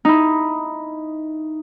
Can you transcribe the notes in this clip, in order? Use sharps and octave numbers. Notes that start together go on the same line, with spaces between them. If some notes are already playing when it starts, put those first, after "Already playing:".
D#4 E4